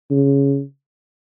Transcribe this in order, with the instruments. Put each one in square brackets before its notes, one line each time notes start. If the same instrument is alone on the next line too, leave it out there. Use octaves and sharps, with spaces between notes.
[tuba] C#3